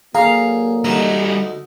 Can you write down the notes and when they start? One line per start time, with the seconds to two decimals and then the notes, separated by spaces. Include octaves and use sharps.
0.15 D3 F#3 A#3 G#4 F5 A#5
0.84 D2 G3 D#4 D#5